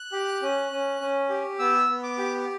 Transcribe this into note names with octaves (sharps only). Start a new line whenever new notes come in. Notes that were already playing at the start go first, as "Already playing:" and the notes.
Already playing: F#6
G4
C#4
C#4
C#4
G4
B3 E6
B3
D6
G4